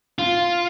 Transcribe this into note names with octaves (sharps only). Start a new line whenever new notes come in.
F4